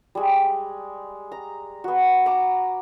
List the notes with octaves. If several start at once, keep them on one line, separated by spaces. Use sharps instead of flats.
G3 G#3
A#5
B3 F#4
F#5 A#5 B5 D6